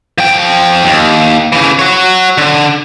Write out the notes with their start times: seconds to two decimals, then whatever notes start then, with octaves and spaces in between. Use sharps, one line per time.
0.18 F3 G5
0.85 D#2
1.52 C#3 E3
1.79 F#4 C#5
2.38 D3